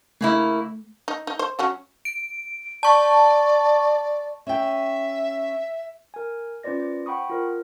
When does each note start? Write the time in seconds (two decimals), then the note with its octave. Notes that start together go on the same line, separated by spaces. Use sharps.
0.21 C#3 A3 A#3 E4
1.08 D#4
1.27 D#4
1.39 C5
1.59 F#3 C#4 F#4
2.05 D7
2.83 D5 A5 C#6
4.47 C#4 E5 G5
6.14 A#4 G#5
6.63 C#4 F4 B4 C5 D5 A#6
6.80 C5
7.06 F#5 G5 B5 C#6 D#6
7.29 F4 A#4 C5